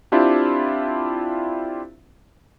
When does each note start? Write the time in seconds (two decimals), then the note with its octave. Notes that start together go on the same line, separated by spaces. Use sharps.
0.12 C4 D4 E4 F4 G4